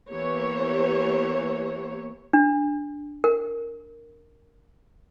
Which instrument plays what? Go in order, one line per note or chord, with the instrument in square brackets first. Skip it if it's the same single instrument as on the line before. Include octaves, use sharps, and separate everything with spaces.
[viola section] E3 A#3 B3 G4 C#5
[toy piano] D4
A#4